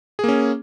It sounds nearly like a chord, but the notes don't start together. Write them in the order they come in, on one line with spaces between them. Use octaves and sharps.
G#4 A#3 C#4